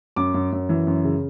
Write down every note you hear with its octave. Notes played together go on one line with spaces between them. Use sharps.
F#2 D6
F#2
F#2
E3
F#2
C#3